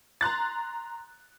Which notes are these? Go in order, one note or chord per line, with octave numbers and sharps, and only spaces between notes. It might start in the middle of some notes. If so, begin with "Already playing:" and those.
A#5 C6 F#6 A6